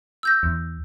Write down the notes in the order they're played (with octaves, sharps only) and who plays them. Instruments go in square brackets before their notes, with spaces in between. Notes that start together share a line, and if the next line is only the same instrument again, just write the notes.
[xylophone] E6 G6 A#6
[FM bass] E2